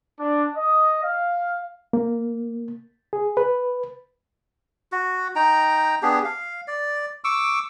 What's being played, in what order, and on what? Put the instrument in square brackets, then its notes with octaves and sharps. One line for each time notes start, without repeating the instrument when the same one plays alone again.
[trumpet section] D4
D#5
F5
[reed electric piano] A#3
G#4
B4
[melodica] F#4
D#4 G5 A#5
B3 D4 G4 G#4
F5
D5
C#6 D6 E6